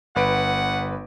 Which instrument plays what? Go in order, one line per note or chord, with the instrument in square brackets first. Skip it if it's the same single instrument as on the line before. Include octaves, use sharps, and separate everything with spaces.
[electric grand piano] G1 B4 D7 [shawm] F#5